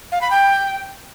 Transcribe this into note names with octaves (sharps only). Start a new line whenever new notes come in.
F5
B5
G5